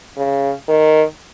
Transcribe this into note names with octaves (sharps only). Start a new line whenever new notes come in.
C#3
D#3